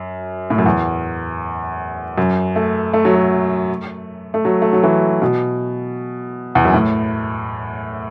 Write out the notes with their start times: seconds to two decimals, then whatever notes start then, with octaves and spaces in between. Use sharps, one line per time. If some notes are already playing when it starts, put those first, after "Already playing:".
Already playing: F#2
0.50 A2
0.58 F#2
0.66 E2
2.18 F#2
2.56 A3
2.93 A3
3.05 F#3
3.15 A3
4.34 A3
4.45 F#3
4.62 A3
4.73 F#3
4.83 E3
5.22 B2
6.55 E2
6.65 F#2
6.74 A2